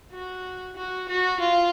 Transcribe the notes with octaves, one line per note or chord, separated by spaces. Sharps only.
F#4
F#4
F#4
F4